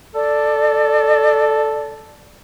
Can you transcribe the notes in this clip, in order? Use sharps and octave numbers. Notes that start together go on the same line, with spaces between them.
A4 D5